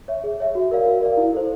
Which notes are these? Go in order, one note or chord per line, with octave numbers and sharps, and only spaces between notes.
C#5 E5
G#4
C#5 E5
F#4
A#4 D5 F5
F#4
A#4 D5 F5
E4
A4 C5